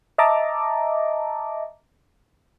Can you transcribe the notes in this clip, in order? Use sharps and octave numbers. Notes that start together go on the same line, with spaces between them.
D#5 E5 A5 A#5 D6